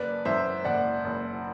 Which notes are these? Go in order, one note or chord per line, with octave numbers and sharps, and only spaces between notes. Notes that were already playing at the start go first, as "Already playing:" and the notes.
Already playing: F#1 B4 D5
F#2 C5 E5
F#1 D5 F#5
F#1